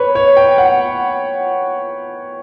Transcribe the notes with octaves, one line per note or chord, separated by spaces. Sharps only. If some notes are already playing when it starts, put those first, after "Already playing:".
Already playing: B4 C#5
C#5
G5
F#5